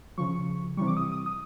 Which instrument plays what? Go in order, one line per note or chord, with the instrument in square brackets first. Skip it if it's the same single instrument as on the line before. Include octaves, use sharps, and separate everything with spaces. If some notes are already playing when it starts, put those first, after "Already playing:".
[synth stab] C#3 F3 C#6
C3 E3 G3 C#6
D6
D#6
D#6
D#6